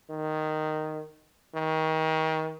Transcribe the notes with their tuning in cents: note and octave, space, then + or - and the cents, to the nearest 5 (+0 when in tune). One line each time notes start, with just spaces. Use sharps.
D#3 -5
D#3 +30